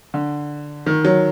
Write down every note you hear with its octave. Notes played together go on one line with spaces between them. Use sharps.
D3
D#3
F#3